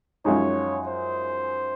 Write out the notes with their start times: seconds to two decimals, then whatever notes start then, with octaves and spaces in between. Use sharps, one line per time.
0.25 F#2 F3 G#3 D#4 C#5
0.87 C5